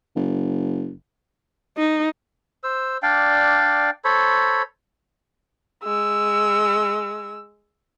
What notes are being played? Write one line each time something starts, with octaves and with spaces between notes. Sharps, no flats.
F#1
D#4
C5 E6
D4 D5 F5 G5
A4 C5 C#5 B5
G#3 E6